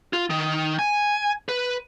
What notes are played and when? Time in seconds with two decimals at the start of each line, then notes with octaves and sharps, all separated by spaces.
0.13 F4
0.30 D#3
0.79 G#5
1.49 B4